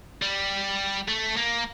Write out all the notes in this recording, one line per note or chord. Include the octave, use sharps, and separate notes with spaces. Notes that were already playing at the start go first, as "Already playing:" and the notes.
G3
A3
A#3